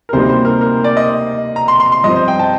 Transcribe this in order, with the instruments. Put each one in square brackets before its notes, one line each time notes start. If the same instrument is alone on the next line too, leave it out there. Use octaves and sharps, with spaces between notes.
[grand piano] A#4
[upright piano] D2 C3 G3 A#3 D#4 [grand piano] C5
[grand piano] C5
A#4
A#4
D5
D#5
A#5
C6
C6
C6
[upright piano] G2 F3 C4 [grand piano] D#5
[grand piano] C5
G5
A5